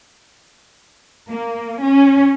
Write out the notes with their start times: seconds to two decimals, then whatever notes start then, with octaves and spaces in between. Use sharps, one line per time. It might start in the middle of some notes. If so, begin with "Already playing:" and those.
1.29 A#3
1.82 C#4